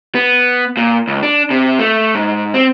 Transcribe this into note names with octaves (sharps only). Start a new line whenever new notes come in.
B3
A#2
C#2
D4
C3
A3
G#2
C4